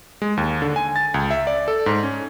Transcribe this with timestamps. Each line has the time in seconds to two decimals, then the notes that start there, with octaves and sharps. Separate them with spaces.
0.22 G#3
0.37 D#2
0.62 D3
0.76 G#5
0.96 A6
1.14 C#2
1.31 E5
1.47 D5
1.68 A4
1.86 G#2
2.03 C#4